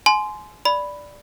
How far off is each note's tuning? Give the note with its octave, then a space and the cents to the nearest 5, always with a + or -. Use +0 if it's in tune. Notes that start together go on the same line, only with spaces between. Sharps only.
G#5 +30 C6 -10
D5 +0 B5 +0